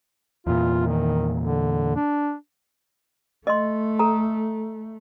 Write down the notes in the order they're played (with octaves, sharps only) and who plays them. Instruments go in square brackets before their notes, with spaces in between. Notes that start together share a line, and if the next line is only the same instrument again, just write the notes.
[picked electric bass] E2 A#2 [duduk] F4
[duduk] D#3
D3
D4
[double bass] A3 [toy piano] D#5 C6
[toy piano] A4 A#5